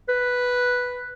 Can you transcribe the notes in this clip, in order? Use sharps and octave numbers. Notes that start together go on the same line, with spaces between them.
B4